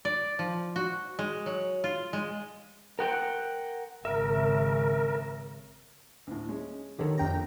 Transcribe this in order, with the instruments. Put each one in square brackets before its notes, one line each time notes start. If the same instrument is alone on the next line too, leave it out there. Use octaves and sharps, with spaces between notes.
[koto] D5
F3
F#4
G#3
F#3
F4
G#3
[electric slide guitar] A#4 F#5 G5
[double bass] G#1 C#3 [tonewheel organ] A#4 [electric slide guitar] E5
[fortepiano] D2 A2
G#3 C#4
[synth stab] D3 D#3 [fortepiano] G4 A4 C#5
[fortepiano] A#1 D3 [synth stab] F2 G5 A#5